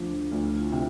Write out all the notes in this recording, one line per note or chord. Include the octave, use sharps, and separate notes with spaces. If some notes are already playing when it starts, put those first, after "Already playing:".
Already playing: D2 F3 D4
D2 F4
E4
F4
C3